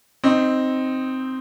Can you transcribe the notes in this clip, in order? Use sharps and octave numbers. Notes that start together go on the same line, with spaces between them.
C4 D#4